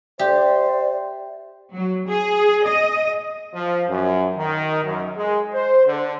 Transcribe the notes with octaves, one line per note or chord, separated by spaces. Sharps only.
G4 C5 D5 E5 G5
F#3
G#4
D#5
F3
F#2
D#3
F#2
G#3
C5
D3